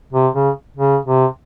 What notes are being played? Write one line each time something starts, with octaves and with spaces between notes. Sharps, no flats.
C3
C#3
C#3
C3